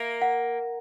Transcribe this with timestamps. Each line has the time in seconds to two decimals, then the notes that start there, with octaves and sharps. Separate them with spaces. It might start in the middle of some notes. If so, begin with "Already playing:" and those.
Already playing: A#3 E5
0.22 F#5